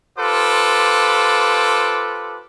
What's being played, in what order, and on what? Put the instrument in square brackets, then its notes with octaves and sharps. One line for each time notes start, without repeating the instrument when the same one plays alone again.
[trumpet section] F4 G4 A4 B4 C5 D6